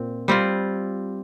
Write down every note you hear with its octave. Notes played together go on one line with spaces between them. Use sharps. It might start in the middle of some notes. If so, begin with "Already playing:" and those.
Already playing: A#2 C4
G3 C4 F4